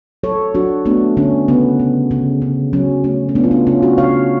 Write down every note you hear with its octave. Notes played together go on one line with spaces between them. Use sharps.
F#3 A4 C#5
F#3 D4 F#4
A3 B3 D4
D3 C#4
C#3 B3
C#3
C#3
C#3
F#3 C#4
A3 C#4
C#4
A3 B3 D4
F4
B3 D4
C#3 C#4 F4
D4 F#4
C#3 C#5 F5